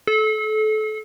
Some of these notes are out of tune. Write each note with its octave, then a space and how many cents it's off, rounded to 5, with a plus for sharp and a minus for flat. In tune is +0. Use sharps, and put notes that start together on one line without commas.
A4 -30